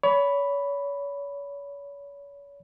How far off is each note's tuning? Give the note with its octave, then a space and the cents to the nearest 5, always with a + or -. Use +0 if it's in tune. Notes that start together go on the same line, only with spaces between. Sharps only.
C#5 +35 B5 +0